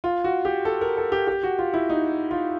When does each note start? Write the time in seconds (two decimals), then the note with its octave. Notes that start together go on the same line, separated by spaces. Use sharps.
0.04 F4
0.24 F#4
0.45 G4
0.65 A4
0.81 A#4
0.97 A4
1.12 G4
1.27 G4
1.43 F#4
1.59 F4
1.74 E4
1.89 D#4
2.31 F4